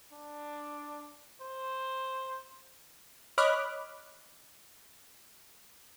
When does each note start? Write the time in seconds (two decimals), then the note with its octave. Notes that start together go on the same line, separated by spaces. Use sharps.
0.13 D4
1.42 C5
3.38 C#5 D#5 B5 D6 F6 F#6